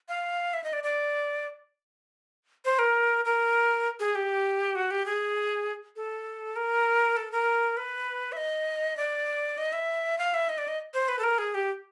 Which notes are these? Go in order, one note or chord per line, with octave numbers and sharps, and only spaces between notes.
F5
E5
D#5
D5
D5
C5
A#4
A#4
G#4
G4
F#4
G4
G#4
A4
A#4
A4
A#4
B4
E5
D#5
D5
D#5
E5
F5
E5
D#5
D5
D#5
C5
B4
A4
A#4
G#4
G4